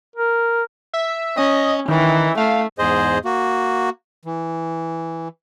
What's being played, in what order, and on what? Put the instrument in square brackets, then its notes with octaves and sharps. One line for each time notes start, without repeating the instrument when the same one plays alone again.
[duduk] A#4
[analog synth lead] E5
[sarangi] C#4 [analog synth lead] D#5
[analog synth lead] D#3 [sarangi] E3
[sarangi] A3 [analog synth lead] F5
[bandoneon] E2 G#2 G#4 C5 D#5
A#3 F#4
E3